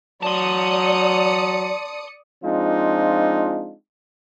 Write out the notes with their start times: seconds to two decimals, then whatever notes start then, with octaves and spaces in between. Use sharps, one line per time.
0.23 F#3 D5 A5 C6 D#6 C#7
2.44 F3 G#3 C4 D4 D#4 F4